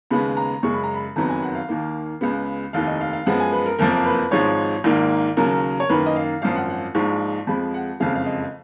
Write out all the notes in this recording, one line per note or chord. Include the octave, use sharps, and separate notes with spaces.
D#2 C#3 G#3 B3 B5
A#5
F#2 C#3 G#3 C#6
B5
A#5
B5
F#1 F2 D#3 F#3 B3 A#5
G#5
F#5
F5
D#2 D#3 A#3
C#2 C#3 G#3 B3
F1 D#2 D#3 F5
D#5
F5
F5
F#2 F3 G#3 B3 F#5
G#5
B4
A#4
F#1 F2 F3 A#3 A#4
B4
G#1 G#2 F3 G#3 C#5
A#1 G#2 D#3 A#3
D#2 C#3 F#3 A#4
C#5
F#2 D#3 A#3 B4
D#5
F5
G#1 F#2 F3 F5
F#5
F#5
A#1 G#2 F3 G#3 C#6
F2 F3 G#3 B5
F#5
F#1 F2 C#3 F3 G#3 F5
F5
D#5